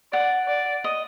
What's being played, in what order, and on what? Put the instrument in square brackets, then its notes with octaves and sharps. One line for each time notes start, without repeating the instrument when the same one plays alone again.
[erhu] D5 [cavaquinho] F#5
[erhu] D5
[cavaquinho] D#5